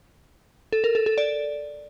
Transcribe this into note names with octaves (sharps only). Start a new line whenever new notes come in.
A4
A#4
A4
A4
D5